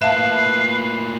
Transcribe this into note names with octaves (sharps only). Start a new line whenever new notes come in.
A2 A#3 B4 E5 F5 A5 C7